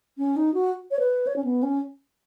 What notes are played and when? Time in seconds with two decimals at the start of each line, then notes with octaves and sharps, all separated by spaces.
0.18 C#4
0.36 D#4
0.54 F#4
0.91 C#5
0.99 B4
1.27 C#5
1.36 C#4
1.44 B3
1.63 C#4